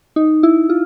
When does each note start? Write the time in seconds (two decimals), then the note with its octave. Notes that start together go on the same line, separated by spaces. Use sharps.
0.16 D#4
0.43 E4
0.69 F4